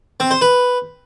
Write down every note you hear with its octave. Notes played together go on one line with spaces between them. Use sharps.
C4
C5
B4